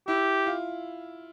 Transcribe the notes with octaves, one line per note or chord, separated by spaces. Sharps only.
E4 G4
F4